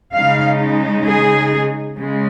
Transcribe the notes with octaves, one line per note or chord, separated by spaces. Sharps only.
C#3 G#3 D#4 F5
G#4
C#3 G#3